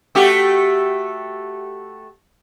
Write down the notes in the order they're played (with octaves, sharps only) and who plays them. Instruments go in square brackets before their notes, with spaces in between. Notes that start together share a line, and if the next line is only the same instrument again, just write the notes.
[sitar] A3 F#4 G4